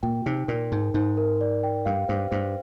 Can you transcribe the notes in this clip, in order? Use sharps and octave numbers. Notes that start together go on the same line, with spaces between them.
A#2 G5
C3 D#4
A#2 A#4
G#2 D#4
G#2 D#4
A#4
D5
G5
G2 F5
G2 C5
G2 C5